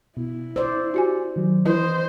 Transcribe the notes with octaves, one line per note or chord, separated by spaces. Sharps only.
B2 E4
C5 D5 E6
F#4 G4 G#5
D#3 F#3
E3 E4 C5 D#5 D#6